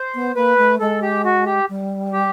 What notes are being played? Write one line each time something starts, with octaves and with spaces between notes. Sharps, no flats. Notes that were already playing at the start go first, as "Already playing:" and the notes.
Already playing: C5
B3
A#3 B4
A3
G#3 A4
G4
F#4
G4
G3
G4